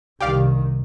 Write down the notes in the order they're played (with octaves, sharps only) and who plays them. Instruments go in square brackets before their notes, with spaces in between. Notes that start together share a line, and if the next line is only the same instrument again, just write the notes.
[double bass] C2 D#3 [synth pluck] G4 D5 F5